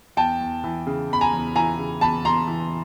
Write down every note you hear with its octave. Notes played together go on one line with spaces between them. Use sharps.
E2 G5 A5
E2
E3
C#3
E2 B5
G#5 A#5
E2
E3 G#5 A#5
C#3
E2 A5 B5
E2 A#5 C6
E3